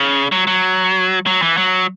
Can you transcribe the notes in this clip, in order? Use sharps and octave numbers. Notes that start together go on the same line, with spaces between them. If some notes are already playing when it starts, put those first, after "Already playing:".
Already playing: C#3
F#3
F#3
F#3
E3
F#3